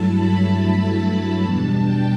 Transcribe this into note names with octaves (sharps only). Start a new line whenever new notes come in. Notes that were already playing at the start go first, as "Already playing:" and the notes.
Already playing: G2 F#3 A3 E4 A5
B5
A5
E2 B2 G3 D4
G5